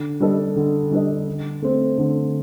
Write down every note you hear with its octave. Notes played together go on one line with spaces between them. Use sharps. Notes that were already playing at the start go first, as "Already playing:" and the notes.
Already playing: D3
G3 D4 A4 D#5
D3
G3 D4 A4 D#5
D3
A3 C4
D3